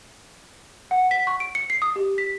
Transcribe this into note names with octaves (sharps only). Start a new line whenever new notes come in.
F#5
B6
C#6
D7
C#7
C7
D#6
G4
B6